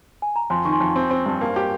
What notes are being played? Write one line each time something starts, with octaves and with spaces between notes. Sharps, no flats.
G#5
A#5
F2 G#5 C6
D#3 C#6
G#5 C6
F2
C4
C4
G2
A#3
G4